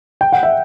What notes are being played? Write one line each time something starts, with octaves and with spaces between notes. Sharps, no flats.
G5
F#5
E5